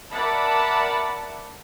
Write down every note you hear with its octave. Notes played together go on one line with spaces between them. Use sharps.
A#4 D5 E5 F#5 A5 B5